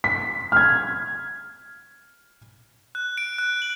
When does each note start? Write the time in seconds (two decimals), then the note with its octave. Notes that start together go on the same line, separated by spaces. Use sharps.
0.04 B6
0.52 F6 G#6
2.95 F#6
3.18 D7
3.38 F#6
3.62 F#7